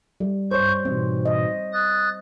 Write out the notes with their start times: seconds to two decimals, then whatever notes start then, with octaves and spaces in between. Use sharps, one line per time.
0.20 G3
0.51 G2 C5 C#5 C#6 G6
0.85 G#2 B2 E3 C4
1.25 D#5
1.73 D#6 F#6 A6